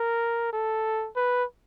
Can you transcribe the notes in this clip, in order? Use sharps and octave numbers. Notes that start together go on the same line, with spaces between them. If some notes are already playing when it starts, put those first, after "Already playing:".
Already playing: A#4
A4
B4